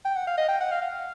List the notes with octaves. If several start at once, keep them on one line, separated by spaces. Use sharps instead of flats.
G5
F#5
F5
D#5
G5
F#5
F5
F5